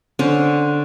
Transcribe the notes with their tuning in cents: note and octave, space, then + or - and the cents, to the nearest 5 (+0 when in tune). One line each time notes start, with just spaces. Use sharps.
D3 +0 C#4 +15 C5 +0